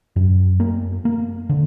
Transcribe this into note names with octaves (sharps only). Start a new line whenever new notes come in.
F#2
A#3
A#3
D3